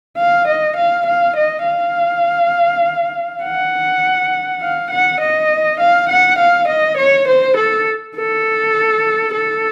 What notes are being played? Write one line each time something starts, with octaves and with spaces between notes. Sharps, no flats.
F5
D#5
F5
F5
D#5
F5
F#5
F5
F#5
D#5
F5
F#5
F5
D#5
C#5
C5
A4
A4
A4